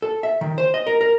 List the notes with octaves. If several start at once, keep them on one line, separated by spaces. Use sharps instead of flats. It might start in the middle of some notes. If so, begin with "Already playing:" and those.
A4
E5
D#3
C5
D#5
A#4
A#4